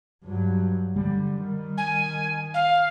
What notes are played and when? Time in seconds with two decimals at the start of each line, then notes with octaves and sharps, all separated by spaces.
0.24 G2 F#3
0.96 D3 G3
1.43 D#3
1.77 G#5
2.54 F5